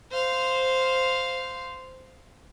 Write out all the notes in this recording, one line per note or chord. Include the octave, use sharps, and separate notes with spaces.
C5 F5